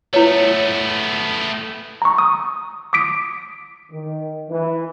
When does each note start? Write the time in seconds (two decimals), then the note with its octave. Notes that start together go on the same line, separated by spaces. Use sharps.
0.14 A3 B3 E4 B4 C#5
2.02 A#5 C#6
2.18 D#6
2.93 D6 D#6 B6 D7
3.91 D#3
4.48 E3